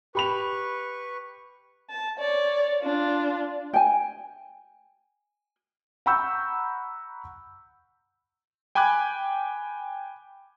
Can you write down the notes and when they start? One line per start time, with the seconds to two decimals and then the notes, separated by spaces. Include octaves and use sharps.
0.15 G4 B4 B5 C#6 F7
1.90 A5
2.19 C#5 D5
2.82 D4 F4
3.73 G5 G#5
6.06 F#5 A#5 B5 C#6 E6 G6
8.75 G5 G#5 B5 D6 F#6 G#6